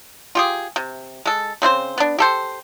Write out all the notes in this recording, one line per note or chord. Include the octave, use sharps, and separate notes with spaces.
F4 G4 G#4
C3
G#3 A4
C#3 C4 E4 C5
B3 D4
G4 A4 C5